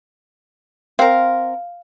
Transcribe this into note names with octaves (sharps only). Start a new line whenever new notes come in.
C4 A#4 F5